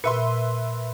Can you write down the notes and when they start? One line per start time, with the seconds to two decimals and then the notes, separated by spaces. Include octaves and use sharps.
0.04 A#2 B4 E5 C6